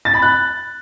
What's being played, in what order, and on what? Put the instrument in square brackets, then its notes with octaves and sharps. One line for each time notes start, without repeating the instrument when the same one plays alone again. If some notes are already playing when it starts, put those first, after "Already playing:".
[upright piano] A6
B5
F#6